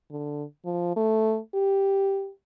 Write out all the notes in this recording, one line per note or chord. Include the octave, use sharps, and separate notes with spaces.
D3
F3
A3
G4